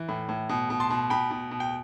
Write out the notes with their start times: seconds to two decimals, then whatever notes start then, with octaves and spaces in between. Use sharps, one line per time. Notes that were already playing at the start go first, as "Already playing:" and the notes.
Already playing: E3
0.09 A2
0.29 A2
0.49 B2
0.70 B2
0.80 A5 C6
0.90 B2
1.10 B2 G5 B5
1.31 B2
1.51 B2
1.60 G5